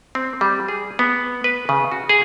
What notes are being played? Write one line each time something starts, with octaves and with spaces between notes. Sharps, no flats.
C4
G3
G#4
B3
B4
C#3
F#4
G#4